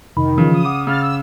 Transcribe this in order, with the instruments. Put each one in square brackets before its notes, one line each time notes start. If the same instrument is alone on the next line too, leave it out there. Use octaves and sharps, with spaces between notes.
[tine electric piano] F2 C3 B5 [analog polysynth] D#3
[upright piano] C#3 [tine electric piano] E3 F3 F4
[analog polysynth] D#6
[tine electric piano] F#5 D6
[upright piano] C#3 [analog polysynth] F6 A6
[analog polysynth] E6